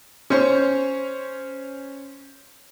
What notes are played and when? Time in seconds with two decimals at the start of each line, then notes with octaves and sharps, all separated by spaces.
0.30 C#4 C5 C#5